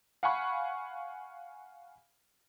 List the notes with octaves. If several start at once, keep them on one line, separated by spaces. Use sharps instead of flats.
F5 F#5 G#5 B5 C#6